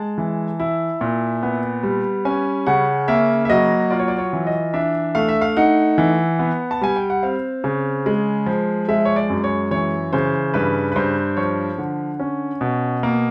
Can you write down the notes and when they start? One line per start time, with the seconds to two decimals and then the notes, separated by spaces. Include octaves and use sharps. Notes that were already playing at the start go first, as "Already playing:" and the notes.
Already playing: G#3 A5
0.18 E3
0.60 E4
1.01 A#2
1.43 B3
1.83 G3
2.25 C#4 G#5
2.67 C#3 F#5
3.08 A#3 E5
3.45 E5
3.50 F#3 D#5
3.90 F4 D5
3.99 C#5
4.08 D5
4.18 C#5
4.33 E3
4.47 D#5
4.74 D4 E5
5.15 A3 F5
5.28 E5
5.41 F5
5.57 D#4 F#5
5.98 E3
6.39 B3
6.71 A5
6.81 G3 G#5
6.96 G5
7.10 F#5
7.23 C4 F5
7.64 C#3
8.06 G#3
8.46 F3
8.88 G#3 E5
9.05 C#5
9.16 D5
9.30 F#2
9.44 C#5
9.71 E3 C#5
10.13 C#3 C5
10.54 G2 B4
10.92 B4
10.96 G2 C5
11.37 F3 C#5
11.78 D3
12.20 C#4
12.61 B2
13.03 A#3